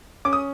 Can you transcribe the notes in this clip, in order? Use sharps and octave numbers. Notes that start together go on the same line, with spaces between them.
C#4 D6
D#6